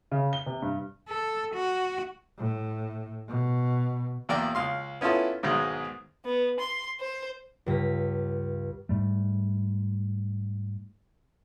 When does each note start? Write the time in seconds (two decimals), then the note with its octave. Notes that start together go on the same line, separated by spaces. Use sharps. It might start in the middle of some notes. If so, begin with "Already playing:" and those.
0.11 C#3
0.33 G7
0.46 C3
0.62 G2
1.08 A4
1.54 F#4
2.39 A2
3.28 B2
4.29 B1 E2 A#3 D5 G5
4.55 C#2 F5 C6
5.01 B3 C#4 E4 F4 A4
5.43 B1 G#2 B2 D#3 G#3
6.25 B3
6.60 C6
7.00 C5
7.66 C#2 G2 A#6 B6
8.89 G#2 G3 A3